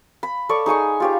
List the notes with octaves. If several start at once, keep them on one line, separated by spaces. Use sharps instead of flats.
B5
A4 C#5 D5 C#6
D#4 G#4 G#5 C#6
F4 G4 C#5